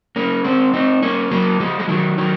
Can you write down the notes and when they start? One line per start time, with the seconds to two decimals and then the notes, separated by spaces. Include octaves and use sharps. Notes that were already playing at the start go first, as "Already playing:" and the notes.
0.16 A#3 C#4
0.44 G#3 C4
0.74 C4 D#4
1.02 A#3 C#4
1.31 F#3 A#3
1.60 F3 G#3
1.79 G#3
1.89 D#3 F#3
2.18 D#3 F#3